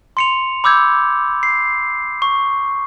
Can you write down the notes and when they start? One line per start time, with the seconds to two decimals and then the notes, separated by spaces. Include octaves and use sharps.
0.17 C6 C#7 F7
0.64 B5 D6 E6 G6 G#6
1.43 C7
2.22 C#6